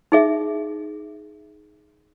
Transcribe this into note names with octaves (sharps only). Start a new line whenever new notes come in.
D#4 G#4 E5